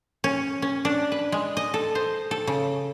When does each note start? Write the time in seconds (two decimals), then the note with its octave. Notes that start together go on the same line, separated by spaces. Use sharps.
0.24 C#4
0.62 C#4
0.85 D4
1.12 B4
1.32 G#3
1.57 D#5
1.74 A4
1.95 C5
2.31 A4
2.47 C#3